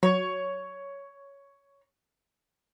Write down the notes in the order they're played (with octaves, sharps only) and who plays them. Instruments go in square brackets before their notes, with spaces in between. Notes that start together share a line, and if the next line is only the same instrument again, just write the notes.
[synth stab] F#3 [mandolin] C#5